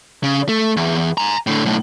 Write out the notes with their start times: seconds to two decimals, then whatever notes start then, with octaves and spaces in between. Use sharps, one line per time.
0.24 C#3
0.49 A3
0.77 E2
1.18 G#5 A#5
1.47 A2 D3
1.65 B1 A2